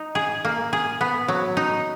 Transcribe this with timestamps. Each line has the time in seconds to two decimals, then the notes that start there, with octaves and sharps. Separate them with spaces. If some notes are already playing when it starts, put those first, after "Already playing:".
Already playing: D#4
0.15 G#4
0.45 A#3
0.73 G#4
1.01 B3
1.28 F#3
1.57 D#4